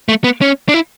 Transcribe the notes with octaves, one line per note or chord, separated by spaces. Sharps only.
A3
B3
C#4
D4
E4